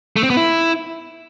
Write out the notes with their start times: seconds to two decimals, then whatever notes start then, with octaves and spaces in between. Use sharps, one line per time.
0.16 A3
0.23 C4
0.30 B3
0.37 E4